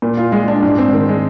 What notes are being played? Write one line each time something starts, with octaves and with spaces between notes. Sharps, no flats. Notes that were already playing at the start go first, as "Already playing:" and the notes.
A#2
F4
G#3
D4
G#2
C4
D#3
G#3